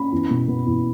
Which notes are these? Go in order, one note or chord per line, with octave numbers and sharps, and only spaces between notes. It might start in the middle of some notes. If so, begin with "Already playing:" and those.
Already playing: C#4 B5
E2
B2
B2
E2